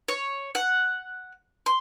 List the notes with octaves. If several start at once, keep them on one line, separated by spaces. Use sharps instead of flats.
C#5
F#5
C6